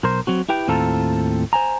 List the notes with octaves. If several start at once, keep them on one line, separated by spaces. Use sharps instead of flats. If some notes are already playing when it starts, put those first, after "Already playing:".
B1 A#4 C5
F#3 C4 F#4
E4 G4 B4 G5
D#2 A2 C4 F4 A4 A#5
C5 G#5 A#5